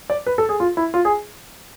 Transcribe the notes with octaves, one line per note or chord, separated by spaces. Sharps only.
D5
B4
A4
G#4
F4
E4
F4
G#4